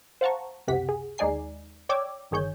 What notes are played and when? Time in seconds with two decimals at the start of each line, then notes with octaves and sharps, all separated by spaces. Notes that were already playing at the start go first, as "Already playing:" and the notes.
0.21 C5 F5 F#5 A5 A#5 C#6
0.67 C#2 F#2 C3 G4 F#5 B6
0.89 G#4
1.18 D#2 G#3 D#4 D5 G#5 C7
1.89 C#5 D5 G5 D6 E6 G#6
2.31 G1 D#3 G#4 C#5 G6